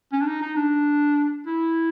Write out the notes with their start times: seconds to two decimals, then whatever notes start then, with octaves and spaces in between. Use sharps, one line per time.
0.12 C#4
0.21 D4
0.27 D#4
0.42 D#4
0.56 D4
1.47 E4